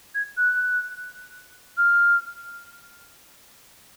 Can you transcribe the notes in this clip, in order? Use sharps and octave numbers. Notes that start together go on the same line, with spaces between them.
G#6
F#6
F6